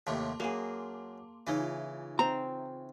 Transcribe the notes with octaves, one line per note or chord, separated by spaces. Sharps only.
D#2 A2 C3 A5 C6 D6
F#2 A#3 G#4
C#3 E3 D#4 F4 E5
C4 A#5